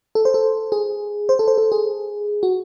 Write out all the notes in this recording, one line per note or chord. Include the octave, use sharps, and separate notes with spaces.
A4
C5
A4
G#4
C5
A4
C5
A4
G#4
F#4